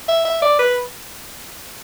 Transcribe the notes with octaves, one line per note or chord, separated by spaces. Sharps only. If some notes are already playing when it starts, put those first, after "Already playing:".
E5
E5
D5
B4